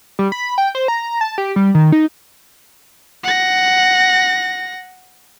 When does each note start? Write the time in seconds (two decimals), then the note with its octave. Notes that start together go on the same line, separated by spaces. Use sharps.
0.19 G3
0.32 B5
0.58 G5
0.75 C5
0.88 A#5
1.21 A5
1.38 G4
1.56 G3
1.75 D#3
1.92 D#4
3.24 F#5 A#6